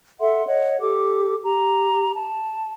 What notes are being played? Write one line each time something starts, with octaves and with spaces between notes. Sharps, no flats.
A4 E5 F#5 C6
C#5 D#5 F#5
G4 A4 D6
G4 A#5
A5